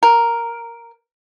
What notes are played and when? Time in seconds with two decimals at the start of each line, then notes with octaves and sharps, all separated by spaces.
0.03 A#4